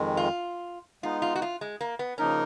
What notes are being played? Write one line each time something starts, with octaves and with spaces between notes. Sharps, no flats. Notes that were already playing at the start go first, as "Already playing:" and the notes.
Already playing: F2 D#3 G#3
F4
G#3 B3 D#4 F4
F4
F#4
F4
G#3
A#3
B3
C#3 F3 A#3 C#4 D#4 A#4